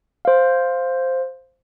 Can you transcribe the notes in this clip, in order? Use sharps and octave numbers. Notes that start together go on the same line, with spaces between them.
C5 F5